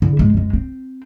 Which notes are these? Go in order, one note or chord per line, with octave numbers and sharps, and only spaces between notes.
D3 E4
A2 G#3
F#2 G#3
C4